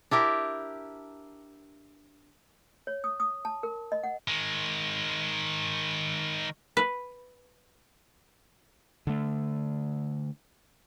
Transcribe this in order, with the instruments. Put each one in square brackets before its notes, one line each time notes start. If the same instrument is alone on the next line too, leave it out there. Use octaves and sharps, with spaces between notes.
[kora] D4 E4 G4 A#4
[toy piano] C#5
D#6
D#6
A5
A#4
D#5
F#5
[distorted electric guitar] D#3 G#3
[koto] B4
[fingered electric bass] D3 A3